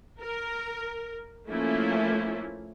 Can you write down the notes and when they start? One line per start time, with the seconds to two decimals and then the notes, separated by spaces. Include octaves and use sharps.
0.19 A#4
1.49 F3 A3 A#3 C#4 E4